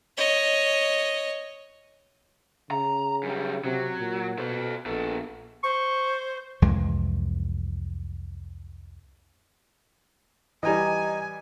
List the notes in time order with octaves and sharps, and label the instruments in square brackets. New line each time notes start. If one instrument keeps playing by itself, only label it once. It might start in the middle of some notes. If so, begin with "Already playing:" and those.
[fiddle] C#5 D#5
[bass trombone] C#3 [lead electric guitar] A#5
[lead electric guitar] F#2 G3
[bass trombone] C3 [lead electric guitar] F#3
[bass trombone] A#2
[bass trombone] B2 [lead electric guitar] A4 C5
[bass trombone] A#1 [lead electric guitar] B3 A4
[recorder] C5 [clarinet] C#6
[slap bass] C2 F2 E3 G#3
[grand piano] E3 G3 [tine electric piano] D#5 A#5 [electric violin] G#5